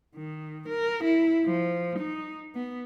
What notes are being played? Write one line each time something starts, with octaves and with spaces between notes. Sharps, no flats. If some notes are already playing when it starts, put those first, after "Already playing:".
D#3
A#4
E4
F3
D#4
B3